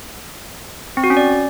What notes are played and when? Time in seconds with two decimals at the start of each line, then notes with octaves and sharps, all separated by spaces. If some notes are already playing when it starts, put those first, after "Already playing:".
0.97 C4
1.04 F#4
1.10 C#4
1.17 D5